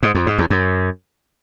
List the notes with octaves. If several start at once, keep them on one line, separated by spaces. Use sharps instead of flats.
G#2
F2
G#2
E2
F#2